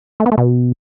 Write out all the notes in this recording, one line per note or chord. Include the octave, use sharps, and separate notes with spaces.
A3
B3
A3
B2